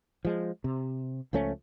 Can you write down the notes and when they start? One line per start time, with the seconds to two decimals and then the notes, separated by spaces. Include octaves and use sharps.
0.25 F3 G#3
0.64 C3
1.33 C#2 F3 A3 C#4